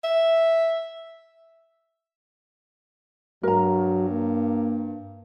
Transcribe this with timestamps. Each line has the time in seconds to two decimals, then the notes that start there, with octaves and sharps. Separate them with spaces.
0.04 E5
3.43 G2 F#3 A#4 A#5
4.10 A#3